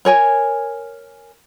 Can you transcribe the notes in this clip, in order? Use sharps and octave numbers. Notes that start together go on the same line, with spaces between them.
A#4 C#5 G#5